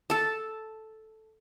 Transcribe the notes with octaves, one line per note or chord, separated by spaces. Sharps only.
A4 A5